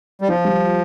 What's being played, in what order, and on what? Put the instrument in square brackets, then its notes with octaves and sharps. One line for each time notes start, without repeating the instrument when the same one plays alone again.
[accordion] G3
[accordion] F3 [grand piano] F4
[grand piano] G3